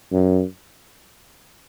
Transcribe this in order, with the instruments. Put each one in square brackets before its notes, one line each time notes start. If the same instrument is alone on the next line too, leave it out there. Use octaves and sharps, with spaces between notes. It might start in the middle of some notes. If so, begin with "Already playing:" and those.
[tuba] F#2